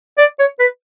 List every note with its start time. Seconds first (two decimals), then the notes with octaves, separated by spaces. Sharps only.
0.18 D5
0.39 C#5
0.59 B4